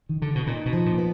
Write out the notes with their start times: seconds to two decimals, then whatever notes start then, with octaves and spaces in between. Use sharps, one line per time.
0.09 D#3
0.22 D3
0.35 B2
0.47 A#2 D#4
0.66 B2
0.73 F3
0.86 A#2
0.98 B3